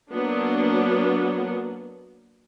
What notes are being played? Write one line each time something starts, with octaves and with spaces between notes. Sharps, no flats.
F#3 A#3 B3 D4